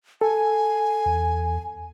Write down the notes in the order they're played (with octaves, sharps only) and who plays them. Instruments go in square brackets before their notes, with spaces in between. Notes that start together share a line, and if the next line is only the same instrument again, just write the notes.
[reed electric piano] A4 [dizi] G#5
[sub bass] E2